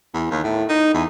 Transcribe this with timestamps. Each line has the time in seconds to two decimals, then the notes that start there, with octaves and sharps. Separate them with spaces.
0.14 E2
0.31 D#2
0.44 A2
0.69 D#4
0.94 E2